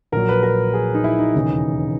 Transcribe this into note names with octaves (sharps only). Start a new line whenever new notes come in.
A#1 A#2 F#3 A#4
B4
A#4
G#4
D#4
E4
D#4
E1 D#2 C#3 E3